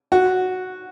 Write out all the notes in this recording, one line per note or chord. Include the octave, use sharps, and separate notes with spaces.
F#4